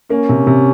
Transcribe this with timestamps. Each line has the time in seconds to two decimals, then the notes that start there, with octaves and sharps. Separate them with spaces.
0.10 A#3 C#4
0.29 C3
0.47 C3